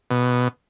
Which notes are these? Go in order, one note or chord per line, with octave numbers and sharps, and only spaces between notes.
B2